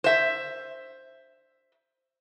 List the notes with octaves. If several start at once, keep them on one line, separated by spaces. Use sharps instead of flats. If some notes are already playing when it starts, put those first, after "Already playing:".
C5 E5